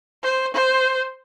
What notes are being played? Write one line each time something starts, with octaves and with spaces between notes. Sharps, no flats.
C5
C5